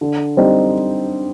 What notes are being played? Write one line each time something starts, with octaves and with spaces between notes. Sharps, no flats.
D3
G3 C4 D#4